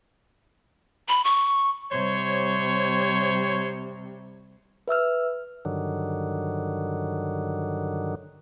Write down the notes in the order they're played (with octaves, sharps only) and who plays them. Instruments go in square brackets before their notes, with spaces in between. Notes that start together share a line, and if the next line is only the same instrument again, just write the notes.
[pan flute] B5
C#6
[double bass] C3 G3 [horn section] C5 C#5
[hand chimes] B4 E5 E6 F6
[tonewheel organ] G2 D3 D#3 F#3